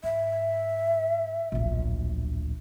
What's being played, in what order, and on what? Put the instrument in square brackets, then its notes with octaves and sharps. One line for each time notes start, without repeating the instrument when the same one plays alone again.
[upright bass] G#2 [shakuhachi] E5
[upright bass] D1 A#1